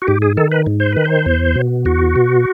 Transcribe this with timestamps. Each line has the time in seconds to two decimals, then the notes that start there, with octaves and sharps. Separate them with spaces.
0.02 F#4
0.08 G#2 G4
0.22 G#4
0.37 D#3 A4
0.52 B4
0.66 G#2
0.80 C5
0.92 D#3 B4
1.05 C5
1.26 E2
1.55 B2
1.85 E2 F#4
2.16 B2